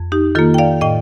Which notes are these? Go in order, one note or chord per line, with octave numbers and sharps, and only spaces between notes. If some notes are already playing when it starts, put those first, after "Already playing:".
Already playing: F2
D#4 G4
D#3 A#3 F4 A4
G5
D5 F5
A2 D#5 G5